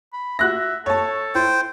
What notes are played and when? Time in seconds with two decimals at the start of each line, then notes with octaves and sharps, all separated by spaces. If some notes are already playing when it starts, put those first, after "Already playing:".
0.13 B5
0.39 F#4 E5 F#6 A#6
0.86 A4 C#5 A5
1.35 E4 C5 G5